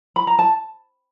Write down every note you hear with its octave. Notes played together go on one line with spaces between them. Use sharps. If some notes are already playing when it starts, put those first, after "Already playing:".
B5
A#5
A5